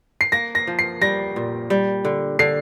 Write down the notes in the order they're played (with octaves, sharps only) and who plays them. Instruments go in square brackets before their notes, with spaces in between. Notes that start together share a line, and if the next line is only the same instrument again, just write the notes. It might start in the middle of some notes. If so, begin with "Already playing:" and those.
[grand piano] C7
[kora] A#3 [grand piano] A#6
[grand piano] A#6
[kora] F3
[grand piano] C7
[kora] G3 [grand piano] A#6
[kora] A#2
G3
D3
[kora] D3 [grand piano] C7